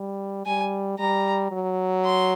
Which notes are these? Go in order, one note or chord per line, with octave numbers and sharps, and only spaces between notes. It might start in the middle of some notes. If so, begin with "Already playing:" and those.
Already playing: G3
G3 G#5
G3 A#5
F#3
C6